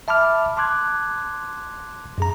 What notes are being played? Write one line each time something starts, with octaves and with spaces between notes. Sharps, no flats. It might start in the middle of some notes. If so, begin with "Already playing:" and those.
E5 A5 B5 D6 F6
A5 C6 D6 F#6 G#6
F#2 G#4 A#5